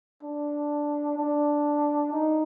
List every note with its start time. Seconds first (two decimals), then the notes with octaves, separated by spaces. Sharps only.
0.23 D4
1.18 D4
2.13 D#4